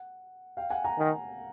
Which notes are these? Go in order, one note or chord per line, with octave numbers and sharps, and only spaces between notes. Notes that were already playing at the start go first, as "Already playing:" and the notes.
Already playing: F#5
F5 G5
F#5 G#5
G#5 A#5
D#3